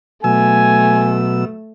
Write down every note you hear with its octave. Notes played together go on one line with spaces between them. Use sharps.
B2 F#3 A3 G#5 E6